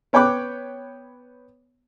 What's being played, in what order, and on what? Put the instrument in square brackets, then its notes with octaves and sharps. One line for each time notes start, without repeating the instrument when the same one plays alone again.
[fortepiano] B3 C#5 G5 B5 D6 F#6